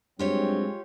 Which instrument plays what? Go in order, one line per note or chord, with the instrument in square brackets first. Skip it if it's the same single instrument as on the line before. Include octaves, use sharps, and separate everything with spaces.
[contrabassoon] G2 [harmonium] F#3 C4 [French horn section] G#3 [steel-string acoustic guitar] F4 G4 C#5